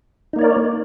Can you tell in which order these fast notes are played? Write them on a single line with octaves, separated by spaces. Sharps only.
D#4 A#3 C#5 D5 A#4